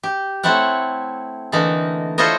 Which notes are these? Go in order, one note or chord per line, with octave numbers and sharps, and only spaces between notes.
G4
A3 C4 E4 C#5 F#5
D3 E3 A3 A#3 D#4
E4 F4 A4 C5 C#5 D#5